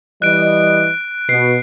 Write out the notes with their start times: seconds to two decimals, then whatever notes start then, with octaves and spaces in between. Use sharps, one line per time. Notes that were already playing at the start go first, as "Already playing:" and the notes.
0.22 E3 G3 D#5 F#6 D7
1.29 B2 C7